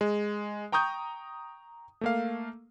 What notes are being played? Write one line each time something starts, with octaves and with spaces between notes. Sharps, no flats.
G#3
G5 A#5 C#6 D#6 G6
A3 A#3 F5